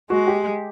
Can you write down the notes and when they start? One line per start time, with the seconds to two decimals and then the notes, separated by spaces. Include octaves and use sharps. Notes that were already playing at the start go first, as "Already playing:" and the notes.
0.10 G#3 F#4
0.27 G4